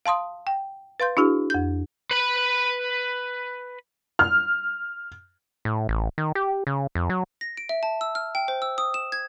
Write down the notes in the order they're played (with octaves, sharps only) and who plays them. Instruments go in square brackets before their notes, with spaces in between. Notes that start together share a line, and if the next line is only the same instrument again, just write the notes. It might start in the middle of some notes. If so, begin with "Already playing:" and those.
[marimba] F5 A5 C6 D#6
G5
B4 F5 C6 G6
D4 E4 F#4 G#4
F2 G6
[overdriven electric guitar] B4 B5
[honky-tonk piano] F6
[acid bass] A2
A1
D#3
G4
C#3
F2
F#3
[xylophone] A#6
D7
E5
A5
E6
F6
G5
C5
E6
D#6
E7
G#6